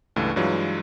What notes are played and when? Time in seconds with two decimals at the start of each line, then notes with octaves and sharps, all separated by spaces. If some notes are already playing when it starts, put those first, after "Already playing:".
0.16 C#2 G2 E3 A3
0.36 G2 E3 F#3 G#3 F4